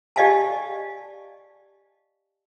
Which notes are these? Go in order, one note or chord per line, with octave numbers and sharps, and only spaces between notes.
G4 D5 D#5 F5 G#5 A5